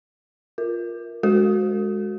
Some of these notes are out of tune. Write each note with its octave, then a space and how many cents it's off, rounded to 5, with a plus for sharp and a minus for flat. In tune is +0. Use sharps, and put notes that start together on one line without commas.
F4 +0 A#4 +0
G#3 +0 F#4 +0 A4 +40